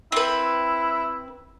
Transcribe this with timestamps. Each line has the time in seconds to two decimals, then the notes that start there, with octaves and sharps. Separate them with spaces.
0.12 C4 E4 B4